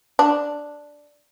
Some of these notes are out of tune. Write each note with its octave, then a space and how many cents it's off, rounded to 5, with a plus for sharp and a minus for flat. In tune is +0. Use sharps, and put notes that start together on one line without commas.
D4 +0